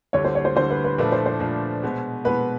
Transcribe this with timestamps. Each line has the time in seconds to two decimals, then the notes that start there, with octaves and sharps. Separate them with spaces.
0.13 D2 D3 G3 C#5
0.24 C5
0.35 C#5
0.45 C5
0.56 D2 D3 G3 C5
0.70 B4
0.84 B4
0.98 A#2 F3 A3 D4 B4
1.12 C5
1.26 C5
1.40 A#2 F3 A3 D4
1.83 B2 G#3 B3
2.24 B2 G#3 B3 B4